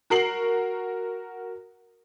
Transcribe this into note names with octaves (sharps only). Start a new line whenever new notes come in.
F#4 A#4 C7 F#7